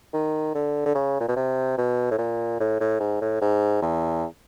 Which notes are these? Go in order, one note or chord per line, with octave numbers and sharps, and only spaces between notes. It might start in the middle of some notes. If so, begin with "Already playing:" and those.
D#3
D3
D3
C#3
A#2
B2
C3
B2
A2
A#2
A2
A2
G#2
A2
G#2
E2